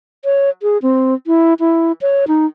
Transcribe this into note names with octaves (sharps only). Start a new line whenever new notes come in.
C#5
G#4
C4
E4
E4
C#5
D#4